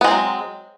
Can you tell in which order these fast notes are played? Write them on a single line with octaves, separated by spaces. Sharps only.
B3 G#3 C4 F#3